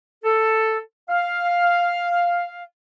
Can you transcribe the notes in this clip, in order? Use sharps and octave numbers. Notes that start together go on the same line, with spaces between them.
A4
F5